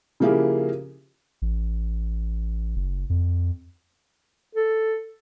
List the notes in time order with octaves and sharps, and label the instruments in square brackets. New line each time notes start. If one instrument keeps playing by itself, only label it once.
[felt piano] C#3 F3 A#3 E4 G4 G#4
[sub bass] A1
F#1
F2
[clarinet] A4